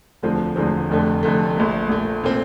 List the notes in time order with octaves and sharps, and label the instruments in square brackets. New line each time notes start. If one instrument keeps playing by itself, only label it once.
[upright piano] E1 D2 D3 F3 C4
E1 D2 D3 F3 C4
F1 F2 D3 A3
F1 F2 D3 A3
A#1 A#2 A3
A#1 A#2 A3
A#2 A3 C4